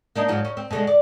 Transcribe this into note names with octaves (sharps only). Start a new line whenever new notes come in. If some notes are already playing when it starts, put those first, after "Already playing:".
A#3 D4 D#4
G#2 F3 F#3
C#4
C4
B2 D3 G#3
D5